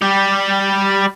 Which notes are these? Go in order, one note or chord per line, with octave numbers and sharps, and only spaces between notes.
G3 G4